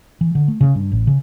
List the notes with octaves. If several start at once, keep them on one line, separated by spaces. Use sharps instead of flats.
E3
D3
A3
C#3
G2
A1
C#3